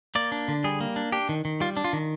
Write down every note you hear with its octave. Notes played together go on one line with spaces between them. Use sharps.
A#3 D5
D4
D3
G3 G#4
A#3
D4
D4 G4
D#3
D#3
G3 F4
D4
F4
D#3